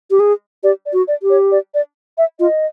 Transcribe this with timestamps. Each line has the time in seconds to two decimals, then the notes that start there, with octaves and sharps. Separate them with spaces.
0.11 G4
0.20 G#4
0.63 G4 D5
0.86 D5
0.93 F#4
1.08 D5
1.23 G4
1.30 C#5
1.52 D5
1.74 D5
2.18 E5
2.40 F4 D#5